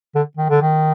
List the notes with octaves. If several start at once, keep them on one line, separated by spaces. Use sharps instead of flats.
D3
D#3
D3
D#3